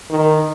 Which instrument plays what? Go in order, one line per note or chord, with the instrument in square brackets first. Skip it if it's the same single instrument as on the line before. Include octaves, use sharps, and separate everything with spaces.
[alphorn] D#3